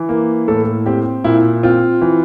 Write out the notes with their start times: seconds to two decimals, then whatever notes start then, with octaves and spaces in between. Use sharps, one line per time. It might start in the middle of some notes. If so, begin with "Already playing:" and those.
Already playing: E3
0.09 A#3
0.48 A2 A4
0.86 C4 G4
1.24 A#2 E4
1.63 C4 F4
2.01 E3